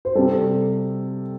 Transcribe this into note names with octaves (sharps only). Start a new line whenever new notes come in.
C5
C3 G3 A4